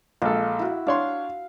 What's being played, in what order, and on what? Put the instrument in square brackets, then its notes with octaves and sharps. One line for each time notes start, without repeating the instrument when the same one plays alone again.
[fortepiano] A#1 G#3 A4 [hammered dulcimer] F5
[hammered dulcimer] E4 F#4
[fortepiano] D4 C#5 C6 [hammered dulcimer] F5